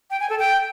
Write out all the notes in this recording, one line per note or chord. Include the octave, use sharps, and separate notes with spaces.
G5
G#5
A4
G5